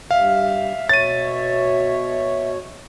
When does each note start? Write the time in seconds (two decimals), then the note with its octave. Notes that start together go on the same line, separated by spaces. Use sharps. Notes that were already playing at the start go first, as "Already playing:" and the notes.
0.11 G2 E5 F5
0.89 B2 C#5 A6 D#7